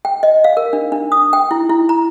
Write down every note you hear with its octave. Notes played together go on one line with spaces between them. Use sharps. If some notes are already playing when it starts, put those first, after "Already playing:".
G5
D#5
F5
A#4
D4
D4
D#6
G5
E4
E4
A#5